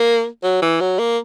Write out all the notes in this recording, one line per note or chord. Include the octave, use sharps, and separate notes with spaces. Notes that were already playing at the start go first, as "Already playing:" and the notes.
Already playing: A#3
F#3
E3
F#3
A#3